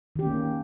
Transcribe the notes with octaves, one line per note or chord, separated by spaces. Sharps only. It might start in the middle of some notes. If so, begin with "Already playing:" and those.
D#3 A#3 C#4 G4